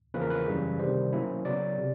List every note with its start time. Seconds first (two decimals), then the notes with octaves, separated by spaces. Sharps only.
0.14 E2 C#3 F3 A#3 C#4 B4
0.22 A#4
0.30 B4
0.47 F#2 C#3 E3 G3
0.79 C3 D#3 G3 C5
1.13 B2 F#3 A#3 C#4 E4
1.45 C#3 F#3 B3 D5
1.78 C3